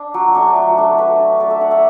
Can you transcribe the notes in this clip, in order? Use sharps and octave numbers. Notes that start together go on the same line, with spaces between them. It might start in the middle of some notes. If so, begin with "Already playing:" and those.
Already playing: D4
F#3
A3 D4
F#3
A3 D4
A3 B4
D4
A3 D5
E5
D4 F#5
E5